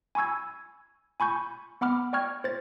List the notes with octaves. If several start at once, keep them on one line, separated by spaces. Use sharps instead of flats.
G#5 B5 C#6 E6 G#6
G#5 B5 C#6 G6
B3 F#5 B5 D6 F6
D5 G5 C#6 F6 G#6
C5 A6